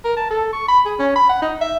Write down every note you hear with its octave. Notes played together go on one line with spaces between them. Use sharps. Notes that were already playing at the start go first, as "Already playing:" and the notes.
A#4
A5
A4
C#6
B5
G#4
C#4
B5
F#5
D#4
E5